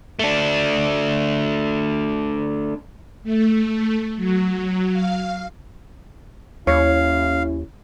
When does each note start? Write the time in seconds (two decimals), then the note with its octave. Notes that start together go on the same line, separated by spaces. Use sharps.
0.19 A3 D4
3.23 A3
4.16 F#3
4.92 F5
6.67 D#2 C#4 E4 C#5 F5